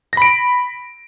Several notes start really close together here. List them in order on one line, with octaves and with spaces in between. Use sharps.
A#6 B5 D7